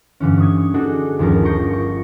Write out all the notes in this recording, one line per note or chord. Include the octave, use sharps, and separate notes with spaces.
G2 D3 E3 C#4
C#6 D#6 G#6
D4 D#4 F#4 G#4 A4
G1 D#2 F3 C#4 A#4 A5
C#6 G6 A#6 C7 D7
C#6